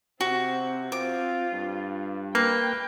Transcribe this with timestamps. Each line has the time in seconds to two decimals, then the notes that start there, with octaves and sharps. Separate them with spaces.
0.21 C3 C4 F#4
0.92 C4 F4 D6
1.52 G2
2.35 A#3 B4 G5